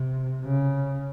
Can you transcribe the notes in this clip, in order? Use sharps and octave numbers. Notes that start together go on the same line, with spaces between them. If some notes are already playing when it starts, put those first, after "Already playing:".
Already playing: C3
C#3